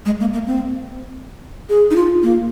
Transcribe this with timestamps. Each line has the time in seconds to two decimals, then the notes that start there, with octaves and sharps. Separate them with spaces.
0.06 G#3
0.20 A#3
0.33 A#3
0.46 C4
1.69 G#4
1.91 D#4
1.96 F4
2.23 A#3